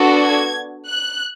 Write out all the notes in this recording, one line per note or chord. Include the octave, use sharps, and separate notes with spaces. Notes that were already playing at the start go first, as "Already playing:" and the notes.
Already playing: B3 D4 F#4 A4
G#6
F#6